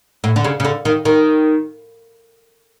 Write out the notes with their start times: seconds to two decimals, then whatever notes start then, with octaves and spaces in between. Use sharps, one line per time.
0.24 A2
0.36 D3
0.44 C#3
0.60 C#3
0.64 D3
0.85 D#3
1.05 D#3